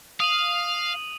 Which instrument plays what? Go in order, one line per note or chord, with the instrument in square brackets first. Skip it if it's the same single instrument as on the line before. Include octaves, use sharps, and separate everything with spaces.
[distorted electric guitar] F5 [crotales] D#6 D#7 F#7